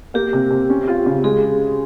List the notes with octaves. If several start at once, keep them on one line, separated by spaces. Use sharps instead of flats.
A#3 G4
C3
C3
C#4
F4
C#3
G#3 G#4